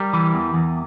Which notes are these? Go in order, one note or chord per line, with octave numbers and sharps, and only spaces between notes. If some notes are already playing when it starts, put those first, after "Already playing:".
Already playing: G3 G4 A#4
E3
E2
E2